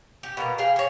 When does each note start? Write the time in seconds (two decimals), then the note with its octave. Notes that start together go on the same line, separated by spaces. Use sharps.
0.23 G4
0.37 B2 A#3 A#5
0.58 G#4 F5 G5
0.76 G#4 C#5